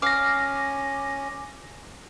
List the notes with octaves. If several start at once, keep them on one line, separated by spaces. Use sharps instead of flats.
C#4 F5 D6 A#6